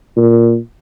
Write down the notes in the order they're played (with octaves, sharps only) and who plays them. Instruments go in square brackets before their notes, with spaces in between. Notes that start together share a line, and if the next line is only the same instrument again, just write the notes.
[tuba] A#2